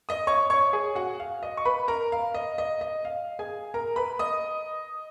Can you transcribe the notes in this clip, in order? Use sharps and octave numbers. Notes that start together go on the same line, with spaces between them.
D#5 D#6
C#5 C#6
C#5 C#6
G#4 G#5
F#4 F#5
F5
D#5
C#6
B4 B5
A#4 A#5
F5
D#5
D#5
D#5
F5
G#4 G#5
A#4 A#5
B4 B5
D#5 D#6